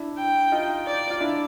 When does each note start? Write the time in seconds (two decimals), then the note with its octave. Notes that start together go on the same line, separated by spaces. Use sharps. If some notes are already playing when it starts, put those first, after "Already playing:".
Already playing: D4 E4
0.18 G5
0.52 D#4 F4
0.87 D5
1.11 F4
1.21 D4 E4